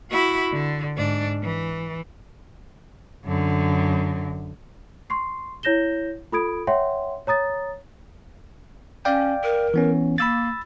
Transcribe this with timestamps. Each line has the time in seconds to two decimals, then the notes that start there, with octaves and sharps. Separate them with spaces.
0.11 E4 F#4
0.52 D3
0.97 G#2 D4
1.43 E3
3.25 F#2 D3
5.10 C6 C#6 C7
5.63 E4 C#5 G6 A#6 E7 G7
6.32 F4 A4 B5 D#6 G#6 D7
6.67 C#5 E5 F#5 G5 C6
7.27 C#5 A#5 D#6 A6
9.05 C#4 D5 F5 G5
9.43 A#4
9.74 E3 B3 C#4
10.18 A#3 B5 E6 A6